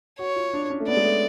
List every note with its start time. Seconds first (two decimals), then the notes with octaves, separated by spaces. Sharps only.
0.19 F#4 C#5
0.36 F4
0.53 D4
0.70 C#4
0.80 A3
0.88 B3 D5
0.97 G#3
1.05 A3